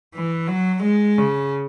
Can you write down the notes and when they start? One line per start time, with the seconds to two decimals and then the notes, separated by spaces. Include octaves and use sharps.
0.14 E3
0.48 F#3
0.84 G#3
1.18 C#3